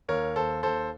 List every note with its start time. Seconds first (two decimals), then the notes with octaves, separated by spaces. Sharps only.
0.08 D#2 A#4 C#5
0.36 D#2 A4 C5
0.63 D#2 A4 C5